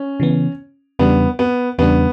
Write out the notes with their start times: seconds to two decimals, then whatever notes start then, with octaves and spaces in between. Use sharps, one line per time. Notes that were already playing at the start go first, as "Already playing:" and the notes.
Already playing: C#4
0.20 C#3 E3 B3
0.99 E2 C#3 G3 B3 D4
1.39 B3
1.78 E2 C#3 G3 B3 D4